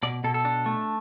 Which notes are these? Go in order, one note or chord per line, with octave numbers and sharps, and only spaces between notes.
B2 D5
B2 A4
A4
D4
A3